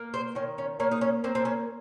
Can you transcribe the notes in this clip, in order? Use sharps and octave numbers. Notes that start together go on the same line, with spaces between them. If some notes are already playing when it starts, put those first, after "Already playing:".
Already playing: A#3
C5
D#3 C#4
C#4
A#3 C#4
D#4
C#4
A#3 C4
C4
C#4